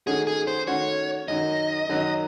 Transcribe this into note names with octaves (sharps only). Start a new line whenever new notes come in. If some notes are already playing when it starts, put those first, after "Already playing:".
D#3 A3 C#4 F#4 G#4
G#4
C5
D#3 A3 C#4 F#4 C#5
F#2 D#3 F#3 D#5
F#2 D#3 F#3